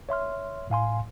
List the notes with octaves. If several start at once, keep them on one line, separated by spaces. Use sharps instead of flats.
C#5 E5 C6 F6
A2 F5 G#5 C6